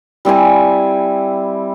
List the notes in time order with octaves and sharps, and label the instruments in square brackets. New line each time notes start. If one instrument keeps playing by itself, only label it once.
[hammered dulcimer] G3 C4 E4 G#5